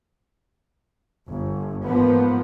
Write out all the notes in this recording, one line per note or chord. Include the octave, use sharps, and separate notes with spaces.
G1
G#2 F3 A#3 B3